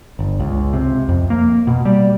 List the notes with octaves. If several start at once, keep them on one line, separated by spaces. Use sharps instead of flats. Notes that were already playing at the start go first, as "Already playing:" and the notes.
G1
C#2
C3
F2
A#3
B2
G3